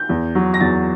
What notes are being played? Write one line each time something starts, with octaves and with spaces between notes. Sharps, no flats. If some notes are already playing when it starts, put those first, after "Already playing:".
Already playing: G6
E2
F#3
A#6
E2 A6